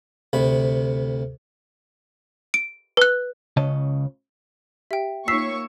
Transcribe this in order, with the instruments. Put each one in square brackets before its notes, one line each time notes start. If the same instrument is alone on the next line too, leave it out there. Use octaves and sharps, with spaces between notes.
[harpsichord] D2 C3 B5
[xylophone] D7
B4 F#6
[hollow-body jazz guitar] C#2 C#3 C#4 D#5 A5
[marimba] G4 [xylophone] E5 G5
[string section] A#3 C#5 C#6 [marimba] D#4 F4 [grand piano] E6 [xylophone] B6 C7